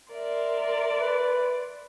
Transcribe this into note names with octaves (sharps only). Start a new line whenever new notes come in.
A#4 D5 E5 C6
B4